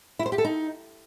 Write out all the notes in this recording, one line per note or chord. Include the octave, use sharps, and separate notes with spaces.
E4
C5
G4
A4
D#4